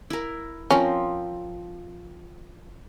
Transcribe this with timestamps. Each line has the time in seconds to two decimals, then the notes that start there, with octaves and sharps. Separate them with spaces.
0.10 E4 A#4
0.71 F3 C4 C#4 A#4